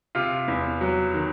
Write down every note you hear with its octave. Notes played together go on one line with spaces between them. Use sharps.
C3 F4
E2
F#3
D#3